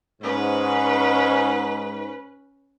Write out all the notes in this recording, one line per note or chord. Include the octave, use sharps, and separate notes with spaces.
G#2 C#4 B4